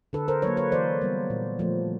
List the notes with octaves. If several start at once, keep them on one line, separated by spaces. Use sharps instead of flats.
D3 A4 B4
A#4 C5
F#3 A#3 B4 C#5
B4 C#5
E3 C5 D5
G3 B3
A#2
F3 A3